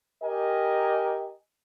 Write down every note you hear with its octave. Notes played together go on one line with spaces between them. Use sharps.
G4 A#4 D#5 G#5